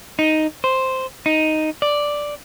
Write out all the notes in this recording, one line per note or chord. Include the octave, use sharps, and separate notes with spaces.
D#4
C5
D#4
D5